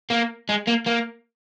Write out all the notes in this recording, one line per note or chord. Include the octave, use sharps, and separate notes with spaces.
A#3
G#3
A#3
A#3